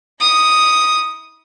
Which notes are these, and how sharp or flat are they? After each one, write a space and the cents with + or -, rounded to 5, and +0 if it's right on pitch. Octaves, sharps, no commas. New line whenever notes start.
E4 -40 D#6 +0